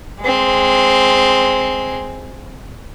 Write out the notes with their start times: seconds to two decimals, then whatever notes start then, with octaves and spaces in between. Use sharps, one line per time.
0.20 G#3 C4